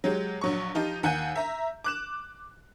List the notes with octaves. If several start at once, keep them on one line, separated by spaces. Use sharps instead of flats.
F#3 G#3 G4
A#1 F#3 C#6
F3 D#4 F4 G4
D#2 F#5 G#5 G6 D#7
E5 A#5
D6 F#6 E7